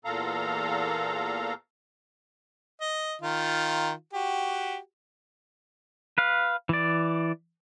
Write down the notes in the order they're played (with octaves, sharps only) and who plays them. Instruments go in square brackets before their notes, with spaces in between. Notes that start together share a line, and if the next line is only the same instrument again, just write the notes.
[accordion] E2 A#2 A4 F5 A#5
[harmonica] D#5
D#3 F4
F#4 G4
[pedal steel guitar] B4 F5
E3 D5